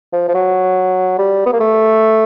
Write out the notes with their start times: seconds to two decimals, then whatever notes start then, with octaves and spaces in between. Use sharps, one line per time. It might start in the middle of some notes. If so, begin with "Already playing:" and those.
0.13 F3
0.29 F3
0.35 F#3
1.19 G3
1.46 B3
1.53 A#3
1.60 A3